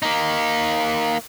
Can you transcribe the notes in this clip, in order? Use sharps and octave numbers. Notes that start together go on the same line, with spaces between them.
A#3 D#4